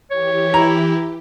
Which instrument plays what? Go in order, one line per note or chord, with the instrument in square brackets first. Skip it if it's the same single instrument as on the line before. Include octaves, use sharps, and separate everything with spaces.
[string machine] E3 G4 [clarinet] C#5
[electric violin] E4 [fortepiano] A#5